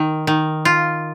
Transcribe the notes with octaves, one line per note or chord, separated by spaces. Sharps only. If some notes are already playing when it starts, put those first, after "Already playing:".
Already playing: D#3
D#3
F4